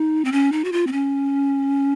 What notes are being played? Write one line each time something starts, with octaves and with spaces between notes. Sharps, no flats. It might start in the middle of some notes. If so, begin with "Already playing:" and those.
Already playing: D#4
C4
C#4
D#4
F#4
F4
C4
C#4